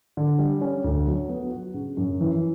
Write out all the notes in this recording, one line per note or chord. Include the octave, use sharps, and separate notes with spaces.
D3
G3
C#4
D2
F#3
B3
F#4
C#3
F#2
E3